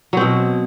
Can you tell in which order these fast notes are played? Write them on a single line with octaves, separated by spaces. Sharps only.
F#3 C4 B2